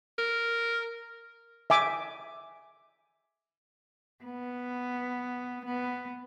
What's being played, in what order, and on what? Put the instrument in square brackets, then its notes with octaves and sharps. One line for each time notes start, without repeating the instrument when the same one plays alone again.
[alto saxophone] A#4
[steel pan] E5 G#5 D6
[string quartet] B3
B3